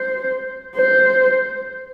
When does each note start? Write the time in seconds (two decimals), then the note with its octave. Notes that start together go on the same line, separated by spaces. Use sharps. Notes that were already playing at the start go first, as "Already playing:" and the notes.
Already playing: C5
0.76 C5